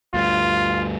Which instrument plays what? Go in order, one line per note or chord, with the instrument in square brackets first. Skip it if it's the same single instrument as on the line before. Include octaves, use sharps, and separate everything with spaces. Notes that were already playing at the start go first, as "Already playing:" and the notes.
[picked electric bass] D2 G2 [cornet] F4